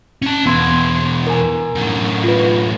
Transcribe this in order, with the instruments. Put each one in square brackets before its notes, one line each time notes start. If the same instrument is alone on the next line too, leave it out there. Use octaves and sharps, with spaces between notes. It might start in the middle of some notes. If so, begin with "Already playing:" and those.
[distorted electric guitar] C#4 A5
[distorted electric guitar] E2 B2 [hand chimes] B3 C6 G#6
[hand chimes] A#4 G#5
[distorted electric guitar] F#2 A2
[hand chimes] F4 B4